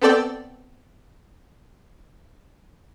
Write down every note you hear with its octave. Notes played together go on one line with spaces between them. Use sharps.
B3 C4 A4 D5 G5